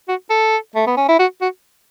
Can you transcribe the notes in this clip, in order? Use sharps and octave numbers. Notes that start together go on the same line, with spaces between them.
F#4
A4
A3
B3
C#4
E4
F#4
F#4